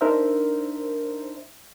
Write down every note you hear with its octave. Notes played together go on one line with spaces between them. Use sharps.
D4 D#4 A#4 C5 E5